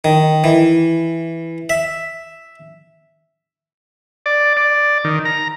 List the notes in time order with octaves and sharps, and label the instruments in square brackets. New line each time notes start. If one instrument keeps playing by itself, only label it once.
[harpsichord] D#3
E3
E5
[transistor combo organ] D5
D5
D#3
A#5